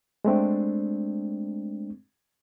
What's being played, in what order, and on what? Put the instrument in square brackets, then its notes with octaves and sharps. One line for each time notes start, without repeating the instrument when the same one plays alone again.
[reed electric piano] G#3 A3 C4 D4